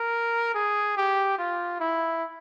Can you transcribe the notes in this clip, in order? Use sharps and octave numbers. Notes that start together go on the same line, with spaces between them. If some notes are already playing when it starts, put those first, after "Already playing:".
Already playing: A#4
G#4
G4
F4
E4